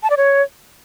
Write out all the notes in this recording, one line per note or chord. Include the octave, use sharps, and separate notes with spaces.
A5
D5
C#5